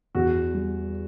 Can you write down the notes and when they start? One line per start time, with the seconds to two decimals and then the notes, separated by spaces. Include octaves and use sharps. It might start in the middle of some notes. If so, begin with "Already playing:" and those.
0.15 E2 F#4
0.54 G3